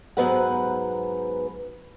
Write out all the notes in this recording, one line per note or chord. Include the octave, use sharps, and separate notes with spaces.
G#2 F#3 B3 B4 C5 F#5